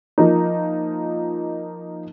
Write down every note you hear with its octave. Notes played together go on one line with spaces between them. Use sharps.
F3 A#3 D#4